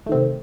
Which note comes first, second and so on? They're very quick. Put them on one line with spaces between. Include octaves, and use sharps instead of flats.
A3 D#3 C4 C3